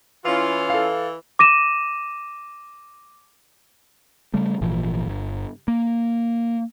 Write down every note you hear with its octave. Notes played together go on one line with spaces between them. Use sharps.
E3 C#4 E4 F4
A4 F5
D6 A#6 D#7 E7
C#3 G3 A3
G#1 A#2 E3 F3
G1
A#3